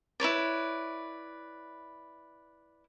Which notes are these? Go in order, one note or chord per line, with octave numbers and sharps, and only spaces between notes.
E4 B4 C#5 D5